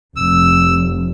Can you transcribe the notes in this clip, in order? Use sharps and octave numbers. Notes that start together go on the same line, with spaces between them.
F1 E6